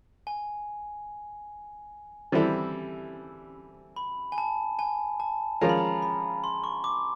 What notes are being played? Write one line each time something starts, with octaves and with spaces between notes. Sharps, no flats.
G#5
E3 G3 C4 E4 A4
B5
G#5
A5
G#5
A5
F3 G#3 C#4 F4 A#4 A#5
B5
A#5
B5
C6
C#6
D6